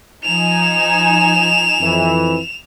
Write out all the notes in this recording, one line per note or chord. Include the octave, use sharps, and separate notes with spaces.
F3 D#4 G#5 E7 F7
F2 E3